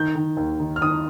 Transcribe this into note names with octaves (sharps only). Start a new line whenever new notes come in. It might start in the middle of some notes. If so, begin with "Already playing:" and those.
Already playing: D#3 G6
D#3
D#2
D#3
F6
D#3 D#6